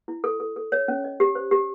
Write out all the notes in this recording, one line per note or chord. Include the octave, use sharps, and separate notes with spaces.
E4
A4
A4
A4
C#5
C#4
D#5
G4
C5
G4